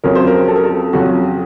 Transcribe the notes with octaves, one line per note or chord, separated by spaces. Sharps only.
F2 C#3 F#3 A#4
C5
A#4
A4
A#4
A4
F2 C#3 F#3 F#4